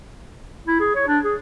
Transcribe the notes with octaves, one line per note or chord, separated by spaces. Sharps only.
E4
G#4
C#5
D4
G#4